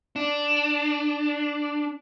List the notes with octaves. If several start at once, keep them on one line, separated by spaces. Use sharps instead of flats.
D4